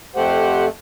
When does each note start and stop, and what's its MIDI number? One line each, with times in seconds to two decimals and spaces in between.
0.16 0.69 41
0.16 0.69 57
0.16 0.65 67
0.16 0.65 72
0.16 0.65 78